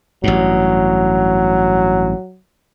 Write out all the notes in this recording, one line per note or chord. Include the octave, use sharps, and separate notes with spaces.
A1 G2 F#3